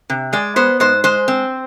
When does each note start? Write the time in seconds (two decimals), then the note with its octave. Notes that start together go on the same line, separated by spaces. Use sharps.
0.10 C3
0.33 G#3 D5
0.56 B3 C5
0.80 G#2 C5
1.04 G#3 C5
1.28 C4